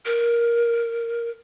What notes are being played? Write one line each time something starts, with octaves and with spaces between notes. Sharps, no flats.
A#4